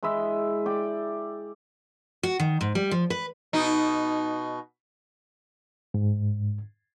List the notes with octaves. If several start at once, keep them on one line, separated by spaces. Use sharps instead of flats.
G#3 E4 D#5 E5
D5 G5
F#4
D#3
G#2
G3
F3
B4
B2 D#4
G#2